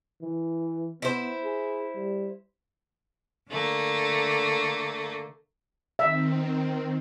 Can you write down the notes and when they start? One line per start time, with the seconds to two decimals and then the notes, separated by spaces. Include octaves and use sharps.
0.22 E3
1.02 B3 E4 C5
1.44 G#4
1.95 G3
3.49 D3 A3 A#3
5.99 D#3 C4 E5